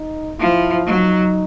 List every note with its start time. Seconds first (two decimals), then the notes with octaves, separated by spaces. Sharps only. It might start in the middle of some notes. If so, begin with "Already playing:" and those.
Already playing: D#4
0.39 F3 E4
0.86 F#3 D#4